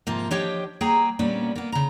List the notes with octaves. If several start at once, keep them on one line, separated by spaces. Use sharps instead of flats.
G#2 C3 F3 A#3
F3 D4 G4 C#5 D#5 G5
F#3 A#3 G#4 G5 G#5 A#5
A#2 G3 A#3 B3 C#4 D4
A#3 B3
C#3 A#5